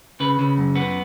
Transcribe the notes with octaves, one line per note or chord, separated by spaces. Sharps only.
C#3 B4
C#3
F#2
B3